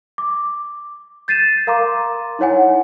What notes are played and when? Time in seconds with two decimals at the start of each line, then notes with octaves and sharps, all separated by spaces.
0.18 D6
1.28 G6 A6 C7 D#7 E7
1.67 A#4 F5 A#5 C6 D6
2.39 D#4 E4 C#5 F#5 G#5